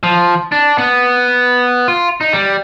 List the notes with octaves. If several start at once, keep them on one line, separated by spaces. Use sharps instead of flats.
F3
D4
B3
F4
D#4
G3